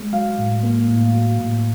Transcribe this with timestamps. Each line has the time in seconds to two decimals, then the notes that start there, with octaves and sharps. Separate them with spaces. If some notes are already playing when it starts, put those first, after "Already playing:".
Already playing: G#3
0.13 F#3 F5
0.38 A2
0.63 A#3
0.88 A2
1.14 F#3
1.39 A2